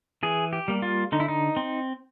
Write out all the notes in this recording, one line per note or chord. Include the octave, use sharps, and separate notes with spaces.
E3 G#4
G4
G3 A#3
F4
D3 D#4
E4
D#4
C4